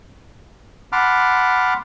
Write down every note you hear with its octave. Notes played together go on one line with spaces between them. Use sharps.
F#5 A5 B5 C6 D6 F6